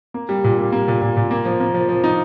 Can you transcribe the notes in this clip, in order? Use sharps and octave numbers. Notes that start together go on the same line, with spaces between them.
A#3
G3
A#2
G3
A#3
A#2
A#2
A#2
A#3
F3
A#3
F3
F3
D#4